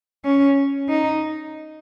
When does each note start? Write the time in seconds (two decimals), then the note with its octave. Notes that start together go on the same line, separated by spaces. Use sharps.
0.25 C#4
0.89 D#4